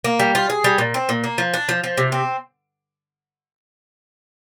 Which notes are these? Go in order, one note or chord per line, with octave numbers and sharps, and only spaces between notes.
A#3
G3
F4
G#4
G3
A#2
C4
A#2
A#3
F3
D4
F3
F3
C3
C4